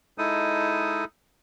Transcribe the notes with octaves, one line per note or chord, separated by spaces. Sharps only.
G#3 D#4 E4 A4 D#6